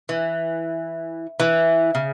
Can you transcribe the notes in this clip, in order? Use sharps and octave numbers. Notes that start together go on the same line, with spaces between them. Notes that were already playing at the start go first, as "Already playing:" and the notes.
E3
E3
C#3